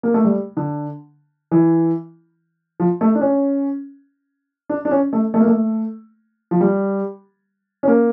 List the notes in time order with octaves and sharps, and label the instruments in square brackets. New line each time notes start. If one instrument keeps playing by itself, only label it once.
[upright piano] A#3
A3
G3
D3
E3
F3
A3
D4
C#4
D4
D4
C#4
A3
A3
A#3
A3
F3
G3
C#4
A#3